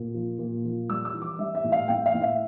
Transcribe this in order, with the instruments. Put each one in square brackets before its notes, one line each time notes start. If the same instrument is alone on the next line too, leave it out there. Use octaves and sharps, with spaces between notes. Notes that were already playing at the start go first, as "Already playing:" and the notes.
Already playing: [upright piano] A#2
F3
A#2
F3
G3 E6
E6
E3
D6
G3 E5
E5
A2
F5
A2 G5
F5
A2
E5